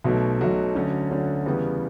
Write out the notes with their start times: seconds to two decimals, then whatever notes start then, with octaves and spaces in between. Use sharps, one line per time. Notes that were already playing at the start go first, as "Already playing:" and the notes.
0.04 B1 B2 F#3 A3
0.39 B1 B2 F#3 A3
0.75 D2 D3 F#3 C#4
1.10 D2 D3 F#3 C#4
1.46 E2 C#3 G3 B3